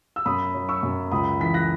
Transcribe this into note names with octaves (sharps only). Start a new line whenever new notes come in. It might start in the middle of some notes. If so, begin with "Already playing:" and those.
E6
F#2 B5 D#6
F#3
C#6 E6
F#2
C#2 B5 D#6
E3 B6
F#6 A#6